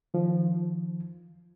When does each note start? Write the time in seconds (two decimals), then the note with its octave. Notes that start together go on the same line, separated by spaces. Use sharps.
0.14 D#3 F3